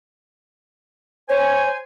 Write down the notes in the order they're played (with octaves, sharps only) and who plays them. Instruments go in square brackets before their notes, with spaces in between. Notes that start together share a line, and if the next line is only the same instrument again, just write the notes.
[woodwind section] C5 G#5 [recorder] C#5